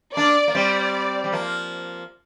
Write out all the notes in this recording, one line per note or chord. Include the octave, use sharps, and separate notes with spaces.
A#3 D4 D5
A#3
G3 C4 D5
G3
F3 A#3